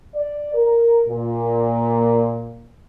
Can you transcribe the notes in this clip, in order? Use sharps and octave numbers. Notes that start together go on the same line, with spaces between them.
D5
A#4
A#2